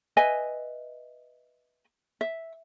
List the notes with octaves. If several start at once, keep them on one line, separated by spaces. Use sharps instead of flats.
B4 D#5 E5 G#5
E5